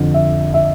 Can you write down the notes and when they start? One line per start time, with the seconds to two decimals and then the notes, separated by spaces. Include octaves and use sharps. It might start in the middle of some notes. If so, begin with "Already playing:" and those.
Already playing: F2 D3
0.14 E5
0.54 E5